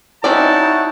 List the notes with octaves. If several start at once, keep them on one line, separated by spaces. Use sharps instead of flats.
C4 C#4 D#4 E4 F#4 D5 A5